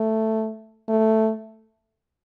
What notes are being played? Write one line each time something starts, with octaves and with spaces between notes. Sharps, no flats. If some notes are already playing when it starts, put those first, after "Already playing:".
Already playing: A3
A3